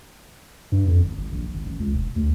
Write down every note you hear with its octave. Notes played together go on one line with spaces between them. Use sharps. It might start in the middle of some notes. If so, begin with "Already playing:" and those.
G2
F2
G#1
G#1
A#1
G#1
A1
C#2
E1
D2